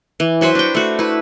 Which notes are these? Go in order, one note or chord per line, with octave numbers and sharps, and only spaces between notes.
E3
F#3 F#4 B4 C5
D4 G5
A3 F#4
E4 B4